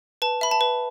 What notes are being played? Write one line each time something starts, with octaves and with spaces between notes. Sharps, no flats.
B4 A5
E5 B5
A5
B4